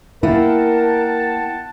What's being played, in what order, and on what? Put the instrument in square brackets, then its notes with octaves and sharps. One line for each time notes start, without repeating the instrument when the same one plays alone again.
[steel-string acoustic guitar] A#3 [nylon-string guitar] E4 [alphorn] A#4 [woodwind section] F#5 G5 A5